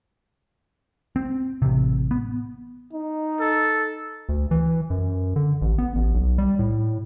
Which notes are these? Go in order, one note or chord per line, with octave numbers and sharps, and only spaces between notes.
C4
A1 C3
B3
D#4
A4
D2
E3
F#2
D3
A1
B3
A1
B1
G3
A2